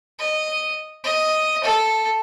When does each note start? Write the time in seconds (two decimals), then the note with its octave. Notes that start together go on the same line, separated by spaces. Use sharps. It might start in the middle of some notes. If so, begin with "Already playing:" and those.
0.19 D#5
1.03 D#5
1.63 A4